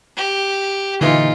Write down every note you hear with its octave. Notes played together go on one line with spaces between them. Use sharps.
G4
A#2 D3 E3 D#4 F4